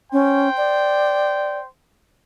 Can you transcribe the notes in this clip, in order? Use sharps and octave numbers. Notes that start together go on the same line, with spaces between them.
C#4 C5 G5
D5